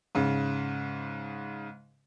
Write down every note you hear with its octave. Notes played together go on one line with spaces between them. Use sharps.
G#2 C#3